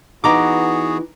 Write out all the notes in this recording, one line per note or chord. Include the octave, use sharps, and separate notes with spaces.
E3 B3 D#4 F#4 G#4 A#5 D6